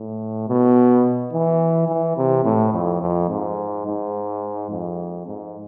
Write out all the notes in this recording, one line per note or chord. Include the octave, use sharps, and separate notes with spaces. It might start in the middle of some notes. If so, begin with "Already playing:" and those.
Already playing: A2
B2
E3
E3
C3
A2
F2
F2
G#2
G#2
F2
G#2